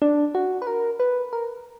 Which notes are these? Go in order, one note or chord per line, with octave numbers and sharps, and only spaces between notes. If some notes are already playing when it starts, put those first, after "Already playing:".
D4
F#4
B4
A#4
B4
A#4